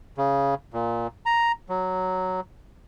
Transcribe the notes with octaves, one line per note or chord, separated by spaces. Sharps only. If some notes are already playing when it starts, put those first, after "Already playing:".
C#3
A#2
A#5
F#3